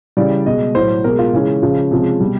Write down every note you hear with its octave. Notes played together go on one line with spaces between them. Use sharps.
C#3 E3 G3 D5
B2 G#3 D#5
A2 F#3 C5
B2 G#3 A#4
F4
C#3 E3 G#3 C#4
C#3 F3 G#3
C3 F3 G#3
B2 G3